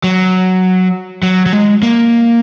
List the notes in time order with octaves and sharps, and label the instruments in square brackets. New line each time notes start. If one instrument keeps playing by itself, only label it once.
[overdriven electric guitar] F#3
F#3
F#3
G#3
A#3